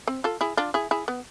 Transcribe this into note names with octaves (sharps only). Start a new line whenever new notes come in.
C4
F4 A4
E4 G#4
D4 F4
E4 G#4
E4 G#4
B3